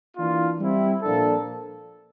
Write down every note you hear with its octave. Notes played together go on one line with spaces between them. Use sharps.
E3 A#3 D4 F4
G3 C4 E4
A#2 F3 A#3 D4 A4